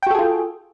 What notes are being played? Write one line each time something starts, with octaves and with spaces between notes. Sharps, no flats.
F4 F#4 G#4 A4 G5